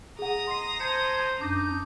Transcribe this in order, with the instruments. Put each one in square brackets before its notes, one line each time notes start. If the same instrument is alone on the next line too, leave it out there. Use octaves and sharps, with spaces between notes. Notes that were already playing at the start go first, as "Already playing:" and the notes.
[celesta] G#4 F#5 [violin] A#5 D#6
[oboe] D#5 [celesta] C6 C7
[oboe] C5 [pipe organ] A5 G6 G#6 [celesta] C#7
[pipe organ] F#2 D4 G6 [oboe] D#4 [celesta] D6